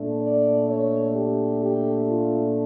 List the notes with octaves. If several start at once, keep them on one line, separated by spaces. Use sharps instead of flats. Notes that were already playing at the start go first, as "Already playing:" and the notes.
Already playing: A#2 A3 D4
D5
C#5
G4
G4
F4